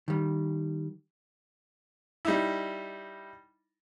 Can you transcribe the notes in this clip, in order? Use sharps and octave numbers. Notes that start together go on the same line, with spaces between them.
D#3 G3
G3 D#4 E4